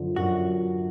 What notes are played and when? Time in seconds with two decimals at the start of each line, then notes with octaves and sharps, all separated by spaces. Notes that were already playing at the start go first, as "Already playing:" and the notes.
Already playing: F#2 D3 F3
0.16 F#2 F#4